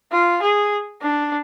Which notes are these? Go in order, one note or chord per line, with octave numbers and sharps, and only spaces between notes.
F4
G#4
D4